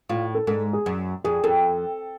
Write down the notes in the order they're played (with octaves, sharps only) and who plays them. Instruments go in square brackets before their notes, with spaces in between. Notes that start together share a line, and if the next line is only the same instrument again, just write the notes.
[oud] A2 [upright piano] F4
[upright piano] A4
[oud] G#2 [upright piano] A4
[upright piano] G#4
[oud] F#2
[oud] F2 [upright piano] G#4
[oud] F2 [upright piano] A4